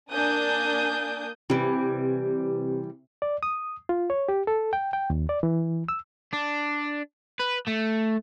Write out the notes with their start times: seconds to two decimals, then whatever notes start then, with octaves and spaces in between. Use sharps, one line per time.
0.12 A#3 D4 G#5 D#6 G6
1.50 C3 E3 G3
3.22 D5
3.43 D#6
3.89 F4
4.10 C#5
4.29 G4
4.47 A4
4.73 G5
4.93 G5
5.10 D#2
5.29 D5
5.43 E3
5.89 E6
6.33 D4
7.40 B4
7.68 A3